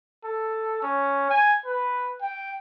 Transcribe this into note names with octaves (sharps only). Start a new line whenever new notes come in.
A4
C#4
G#5
B4
G5